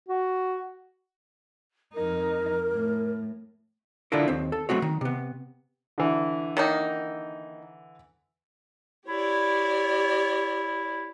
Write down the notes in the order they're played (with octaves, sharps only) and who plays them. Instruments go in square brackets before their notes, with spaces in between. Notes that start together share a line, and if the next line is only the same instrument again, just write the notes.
[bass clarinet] F#4
[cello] F2 D#4 [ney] A#4
[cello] A2
[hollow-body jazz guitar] D3 D4 E4 F4 A4 A#4
D#2 C4
A4
F#3 A3 C4 F#4 C#5
D#3
C3 B3
[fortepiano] D3 E3
[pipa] D#3 A#3 D#4
[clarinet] E4 [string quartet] G4 C#5 D5